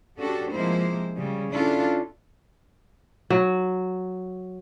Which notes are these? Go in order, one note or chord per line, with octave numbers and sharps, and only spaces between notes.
C#4 D4 F#4 G4 A4
C3 F3 G#3 A#3 E4 C5
C#3 G3
C#4 D4 E4 F4 A4
F#3